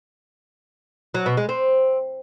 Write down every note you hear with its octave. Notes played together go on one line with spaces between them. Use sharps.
F#3
B2
G#3
C4